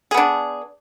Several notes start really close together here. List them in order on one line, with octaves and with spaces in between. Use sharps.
G#4 B3 D4